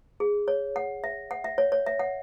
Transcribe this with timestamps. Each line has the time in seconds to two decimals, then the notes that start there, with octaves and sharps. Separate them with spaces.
0.20 G#4
0.48 C#5
0.76 F#5
1.04 E5
1.31 F#5
1.44 E5
1.58 C#5
1.72 C#5
1.86 E5
1.99 F#5